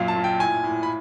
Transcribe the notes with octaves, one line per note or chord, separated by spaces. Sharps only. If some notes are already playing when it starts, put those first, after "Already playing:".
Already playing: F#2 A#2 F5
A5
A#2
G5
A2 G#5
A2
B5